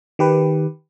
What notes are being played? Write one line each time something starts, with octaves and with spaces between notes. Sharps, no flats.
D#3 G4 B4